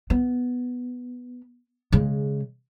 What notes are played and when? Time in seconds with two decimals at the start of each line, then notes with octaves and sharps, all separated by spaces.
0.10 B3
1.92 C#3 G#3